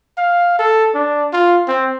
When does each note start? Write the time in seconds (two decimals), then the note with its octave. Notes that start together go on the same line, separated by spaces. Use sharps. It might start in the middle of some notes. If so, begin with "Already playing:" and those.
0.18 F5
0.59 A4
0.95 D4
1.33 F4
1.68 C4